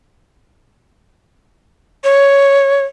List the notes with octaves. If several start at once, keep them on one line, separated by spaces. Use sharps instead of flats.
C#5